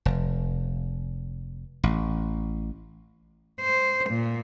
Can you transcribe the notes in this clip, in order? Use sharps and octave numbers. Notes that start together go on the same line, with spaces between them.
F1
A1
C5
A#2